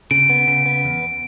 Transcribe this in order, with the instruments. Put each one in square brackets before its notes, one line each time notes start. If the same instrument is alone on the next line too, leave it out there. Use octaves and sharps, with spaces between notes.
[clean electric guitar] C#3 [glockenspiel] D7
[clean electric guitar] B3
C#3
B3
E2